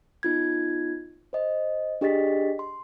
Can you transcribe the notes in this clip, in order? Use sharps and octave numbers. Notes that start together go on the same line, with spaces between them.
B3 D#4 F4 G#6
C5 D#5
D4 G4 G#4 D#5 A6 B6
C6